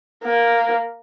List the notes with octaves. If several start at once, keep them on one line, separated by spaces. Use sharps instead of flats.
A#3